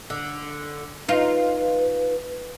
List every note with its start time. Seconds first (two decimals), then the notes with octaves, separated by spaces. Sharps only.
0.10 D3
1.09 D#4 F4 B4